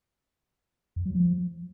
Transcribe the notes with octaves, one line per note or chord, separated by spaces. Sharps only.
F2
F#3
F3